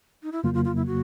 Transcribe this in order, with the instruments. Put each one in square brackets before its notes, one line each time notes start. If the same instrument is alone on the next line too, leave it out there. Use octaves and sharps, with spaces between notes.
[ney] D#4
E4
[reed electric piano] F2 C#3 F#3 A#3 [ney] F4
[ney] F4
F4
E4
F#4